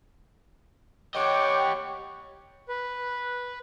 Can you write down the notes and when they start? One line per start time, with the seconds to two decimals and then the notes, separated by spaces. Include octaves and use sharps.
1.15 G4 C#5 D#5 F#5 G5 C#6 D6
2.68 B4